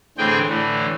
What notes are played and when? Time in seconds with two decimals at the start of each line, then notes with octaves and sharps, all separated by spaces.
0.18 A2 D3 E3 C4 G#4 G5
0.49 A2 D3 E3